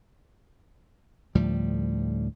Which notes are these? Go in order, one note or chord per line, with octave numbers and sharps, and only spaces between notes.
D2 A2 F3 G3